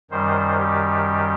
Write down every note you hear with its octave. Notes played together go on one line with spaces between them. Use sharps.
F#2 D#3 G3 C5
G4